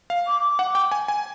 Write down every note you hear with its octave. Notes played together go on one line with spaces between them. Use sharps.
F5
D6
F#5
G5
G#5
G#5